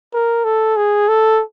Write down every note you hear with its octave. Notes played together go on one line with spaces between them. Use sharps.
A#4
A4
G#4
A4